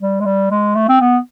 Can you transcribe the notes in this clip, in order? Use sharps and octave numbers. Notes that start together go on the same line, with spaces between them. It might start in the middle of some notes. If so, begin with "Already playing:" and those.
G3
G#3
G3
G#3
A3
C4
B3